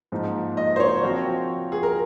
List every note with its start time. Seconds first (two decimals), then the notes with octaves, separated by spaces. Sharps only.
0.12 G#2 F3 A#3 D#4
0.57 D#5
0.76 C5
0.80 C#5
1.02 F3 C4 F#4 A#4
1.72 G#4
1.83 A#4